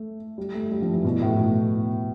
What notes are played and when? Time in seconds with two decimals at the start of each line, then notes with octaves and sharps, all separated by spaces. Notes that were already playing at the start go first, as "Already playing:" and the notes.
Already playing: A3
0.38 G3
0.54 A3
0.71 G3
0.82 F3
0.93 E3
1.05 B2
1.22 A2
1.38 B2